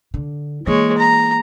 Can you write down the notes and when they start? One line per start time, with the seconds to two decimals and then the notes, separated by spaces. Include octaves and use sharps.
0.14 D3
0.67 E3 G#3 A#3 C#5
0.98 A#5